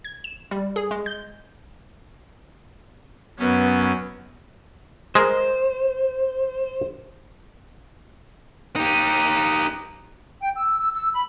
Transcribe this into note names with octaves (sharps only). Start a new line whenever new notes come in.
G#6
E7
G3
G#4
G#3
G6
F#2 B3 C#4
G#3 G#4 A#4 C5
D#4 G4
G5
E6
E6
E6
B5